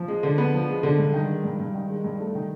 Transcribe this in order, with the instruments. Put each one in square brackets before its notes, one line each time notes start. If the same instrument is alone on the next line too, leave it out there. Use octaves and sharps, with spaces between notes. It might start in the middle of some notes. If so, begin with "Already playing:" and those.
Already playing: [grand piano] F3
G#3
D3
B3
F3
G#3
D3
G2
D#3
G#3
G2
G2
D#3
G#3
G2
A3
D#3